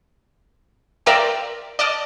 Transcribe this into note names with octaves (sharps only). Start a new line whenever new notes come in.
A#4 D5 E5 F5 G5 C6
D5 D#5 A5 F6